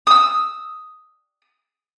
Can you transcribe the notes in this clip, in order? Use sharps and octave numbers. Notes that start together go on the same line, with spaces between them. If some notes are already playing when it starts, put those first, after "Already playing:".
D#6 E6